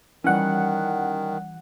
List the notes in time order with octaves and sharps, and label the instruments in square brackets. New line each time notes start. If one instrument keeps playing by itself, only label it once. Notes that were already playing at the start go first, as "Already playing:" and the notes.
[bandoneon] D#3 [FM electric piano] E3 F#5 [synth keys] G3 C#4